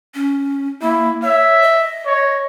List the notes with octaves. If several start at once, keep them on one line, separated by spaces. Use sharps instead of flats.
C#4
A#3 E4
C#5 E5
D#5
C#5